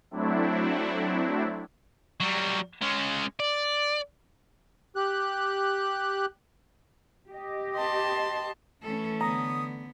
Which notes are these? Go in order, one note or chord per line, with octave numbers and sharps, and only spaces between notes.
F#3 A3 C4 D4 E4
F#3 G3
G#3 C#4
D5
G4 F#6
G4 D#5
A5 C6
E3 A3 C#4 A4
D3 B3 A#5 D#6